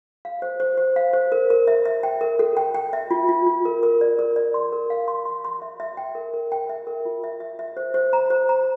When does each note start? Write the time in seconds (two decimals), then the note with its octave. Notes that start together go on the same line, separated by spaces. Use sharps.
0.25 F5
0.42 C5
0.60 C5
0.77 C5
0.96 F5
1.13 C5
1.32 A#4
1.50 A#4
1.67 E5
1.86 E5
2.03 G5
2.21 A#4
2.39 A4
2.57 G5
2.75 G5
2.93 E5
3.11 F4
3.29 F4
3.46 F4
3.65 A#4
3.83 A#4
4.01 D5
4.19 A#4
4.36 D5
4.54 C6
4.72 A#4
4.90 F5
5.08 C6
5.25 C6
5.44 C6
5.62 E5
5.80 E5
5.97 G5
6.15 A#4
6.34 A#4
6.52 G5
6.69 E5
6.87 A#4
7.05 F4
7.24 E5
7.40 E5
7.59 E5
7.77 C5
7.94 C5
8.13 A#5
8.30 C5
8.49 A#5